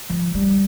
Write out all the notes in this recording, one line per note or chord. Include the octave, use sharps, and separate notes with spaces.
F3
G3